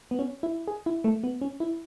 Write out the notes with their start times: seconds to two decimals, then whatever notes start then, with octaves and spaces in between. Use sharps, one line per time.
0.11 B3
0.19 C#4
0.43 E4
0.67 G#4
0.86 E4
1.04 A3
1.23 B3
1.41 C#4
1.60 E4